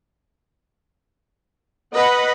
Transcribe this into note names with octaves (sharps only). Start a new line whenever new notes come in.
B4 D#5 F#5 B5